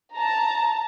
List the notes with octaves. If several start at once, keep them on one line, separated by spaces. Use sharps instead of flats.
A5 A#5